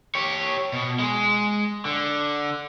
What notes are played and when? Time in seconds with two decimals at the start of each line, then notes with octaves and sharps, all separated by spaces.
0.15 G4 C#5
0.73 B2
0.99 G#3 G#4
1.85 D3